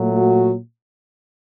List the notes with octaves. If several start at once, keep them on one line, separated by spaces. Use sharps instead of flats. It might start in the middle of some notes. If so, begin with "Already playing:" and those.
Already playing: A#2 F#3 A3
F#4